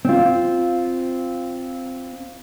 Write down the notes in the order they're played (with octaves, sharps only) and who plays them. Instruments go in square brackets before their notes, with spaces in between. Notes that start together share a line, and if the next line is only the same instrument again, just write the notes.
[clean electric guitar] C4 F4